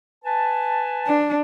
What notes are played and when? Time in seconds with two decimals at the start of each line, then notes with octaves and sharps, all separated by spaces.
0.25 B4 G#5 A5
1.07 D4